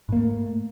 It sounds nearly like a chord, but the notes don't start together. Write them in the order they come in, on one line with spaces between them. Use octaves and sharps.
G#2 A#3 A3